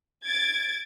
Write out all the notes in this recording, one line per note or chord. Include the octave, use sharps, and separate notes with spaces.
G#6 A6 D7